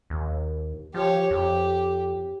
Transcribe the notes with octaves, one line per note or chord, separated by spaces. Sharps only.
D#2
F3 G4 C#5
F2 G4